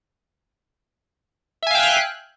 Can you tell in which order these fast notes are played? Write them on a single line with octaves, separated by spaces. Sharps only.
E5 G#5 F5 G5 F#6